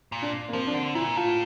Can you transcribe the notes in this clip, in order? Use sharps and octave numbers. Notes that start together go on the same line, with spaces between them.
A#2
D4
A#3
F3 C4
D4
D3 C4
A#2 E4
A2 F4